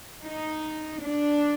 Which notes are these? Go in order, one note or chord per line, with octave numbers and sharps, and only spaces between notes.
D#4
D4